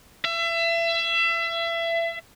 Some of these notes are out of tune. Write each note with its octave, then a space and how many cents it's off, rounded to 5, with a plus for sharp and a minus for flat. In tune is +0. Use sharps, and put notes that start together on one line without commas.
E5 +30